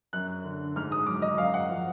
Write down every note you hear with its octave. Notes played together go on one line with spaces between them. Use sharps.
F#2 F#6
D3
G#2 F6
D#6
F#3 D6
D#5
F#2 F5
F#5
F3